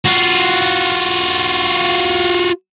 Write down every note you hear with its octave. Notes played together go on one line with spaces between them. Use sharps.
F4 F#4